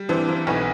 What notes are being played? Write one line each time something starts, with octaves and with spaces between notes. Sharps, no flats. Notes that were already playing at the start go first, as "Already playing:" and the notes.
Already playing: G3
E3 C4 D4
A#3 C4
B1 B3 C#4